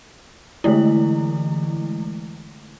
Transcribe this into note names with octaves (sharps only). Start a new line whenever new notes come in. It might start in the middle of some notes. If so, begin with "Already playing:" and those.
D3 E3 G#3 A3 E4